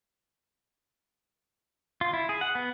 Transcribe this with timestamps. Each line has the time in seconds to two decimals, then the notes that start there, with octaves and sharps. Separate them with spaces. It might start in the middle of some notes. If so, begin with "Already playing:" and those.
2.01 F4
2.13 E4
2.29 G#4
2.41 F#5
2.55 B3